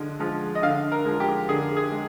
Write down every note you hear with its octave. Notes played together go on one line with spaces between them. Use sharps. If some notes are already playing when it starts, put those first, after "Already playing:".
Already playing: D3 F3 G#3
F3 G#3
D#5
D3 F5
A#4
F3 G#3
G4
D3 G#4
G#4
G#3